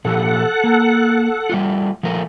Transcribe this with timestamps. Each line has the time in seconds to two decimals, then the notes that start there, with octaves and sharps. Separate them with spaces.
0.05 A#2 F3 G4 A4 F#5
0.64 A#3
1.50 G3 A3 F4
2.03 F3 A3 A#4